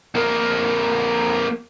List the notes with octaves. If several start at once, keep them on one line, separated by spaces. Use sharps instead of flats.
F2 A#3